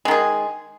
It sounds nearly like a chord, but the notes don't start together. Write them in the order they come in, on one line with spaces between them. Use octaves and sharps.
G#3 D#3 G#4